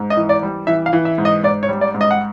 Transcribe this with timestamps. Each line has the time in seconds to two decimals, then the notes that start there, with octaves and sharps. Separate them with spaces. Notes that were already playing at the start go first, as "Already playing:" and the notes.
Already playing: G#2
0.10 D#5
0.17 E3
0.29 D5
0.43 G3
0.67 E3 E5
0.86 F5
0.93 E3
1.05 E5
1.18 G#2
1.25 D#5
1.43 G#2 D5
1.63 C#5
1.69 G3
1.81 D5
1.94 G#2
2.01 D#5
2.11 F#5